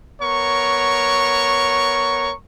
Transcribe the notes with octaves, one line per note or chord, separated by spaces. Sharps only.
B3 A#4 C#5 C#6